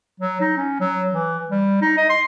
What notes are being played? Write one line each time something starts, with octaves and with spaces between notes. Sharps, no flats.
F#3
D#4
C#4
F#3
E3
G3
D#4
D#5
C6